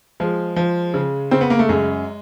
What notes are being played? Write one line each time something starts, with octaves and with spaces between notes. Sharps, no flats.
F3 G#3
F3
C#3
C#3 C4
B3
A#3
A3
F#2 G#3